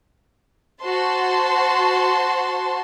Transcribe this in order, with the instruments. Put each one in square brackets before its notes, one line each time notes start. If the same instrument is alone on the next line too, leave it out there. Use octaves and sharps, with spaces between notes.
[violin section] F#4 C5 A5 C6